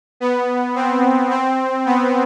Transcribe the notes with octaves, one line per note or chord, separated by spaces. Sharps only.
B3
C4
C4
B3